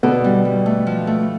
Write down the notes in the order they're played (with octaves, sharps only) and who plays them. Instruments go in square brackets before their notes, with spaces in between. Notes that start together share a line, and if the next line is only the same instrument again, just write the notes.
[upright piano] B2 B3 [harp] D3
[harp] G3
G3
A3
F3
A3